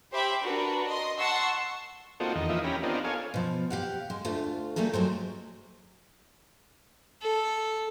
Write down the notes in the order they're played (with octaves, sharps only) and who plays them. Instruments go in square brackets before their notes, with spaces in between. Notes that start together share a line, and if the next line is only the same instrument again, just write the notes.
[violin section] G4 C5 E5 B5 D6
D4 F#4 A#4 B4
D#5 C6
F#5 A5 C6 C#6 E6
[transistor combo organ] A#3 C4 D#4 F4 F#4 A4
E2 D#3 D#4
E3 F3 A#3 D#5 E5
C#4 G4 A#5 B5
B3 C4 D4 D#4 F4 A#4
A4 C#5 F5 G#5
[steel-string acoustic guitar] B2 F3
G4 F5 F#5
G#3
D2 A3 F4
G3 A3 A#3 G#4 A4
F3 F#3 G#3 C4
[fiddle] A4